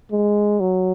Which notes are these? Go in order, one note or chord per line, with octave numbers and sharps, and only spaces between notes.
G#3
F#3